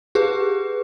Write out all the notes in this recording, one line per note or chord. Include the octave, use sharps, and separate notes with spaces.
G4 G#4 B4